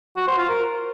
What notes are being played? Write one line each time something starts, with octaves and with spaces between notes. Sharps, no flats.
F#4
C5
F4
A#4